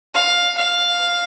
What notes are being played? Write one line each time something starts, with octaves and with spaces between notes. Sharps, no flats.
F5
F5